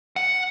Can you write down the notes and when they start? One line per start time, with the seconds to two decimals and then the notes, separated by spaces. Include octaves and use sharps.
0.16 F#5